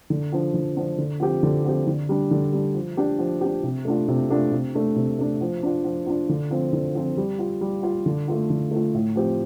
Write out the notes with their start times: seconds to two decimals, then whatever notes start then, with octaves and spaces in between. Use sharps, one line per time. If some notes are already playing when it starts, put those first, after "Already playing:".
0.10 D3
0.32 F3 D4
0.54 D3
0.76 F3 D4
0.98 D3
1.20 F3 C4 G4
1.43 D3
1.65 F3 C4 G4
1.87 D3
2.09 G3 D4
2.31 D3
2.52 G3 D4
2.74 F3
2.97 D4 G4
3.19 F3
3.41 D4 G4
3.63 C3
3.85 A3 D4 F4
4.08 C3
4.30 A3 D4 F4
4.52 C3
4.75 A3 D4
4.96 C3
5.19 A3 D4
5.41 F3
5.63 D4 F4
5.84 F3
6.06 D4 F4
6.29 D3
6.51 F3 C4 F4
6.73 D3
6.95 F3 C4 F4
7.17 G3
7.39 F4
7.61 G3
7.83 F4
8.06 D3
8.28 A3 F4
8.50 D3
8.71 A3 F4
8.94 A2
9.16 F3 C4 G4